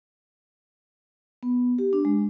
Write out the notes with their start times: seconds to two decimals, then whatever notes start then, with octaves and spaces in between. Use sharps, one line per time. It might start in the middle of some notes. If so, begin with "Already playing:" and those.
1.43 B3
1.78 G4
1.93 D4
2.05 G#3